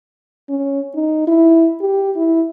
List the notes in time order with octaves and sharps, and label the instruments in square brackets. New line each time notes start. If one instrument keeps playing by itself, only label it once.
[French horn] C#4
D#4
E4
G4
E4